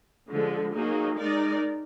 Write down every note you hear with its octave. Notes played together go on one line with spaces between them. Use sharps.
D3 F3 G#3
F#3 A#3 D#4 G#4
G#3 D#4 A#4 D5